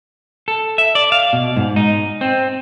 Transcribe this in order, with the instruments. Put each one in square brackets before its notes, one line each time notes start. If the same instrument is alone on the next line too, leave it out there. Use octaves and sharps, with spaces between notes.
[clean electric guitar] A4
E5
D5
F5
B2
G#2
D#4
C4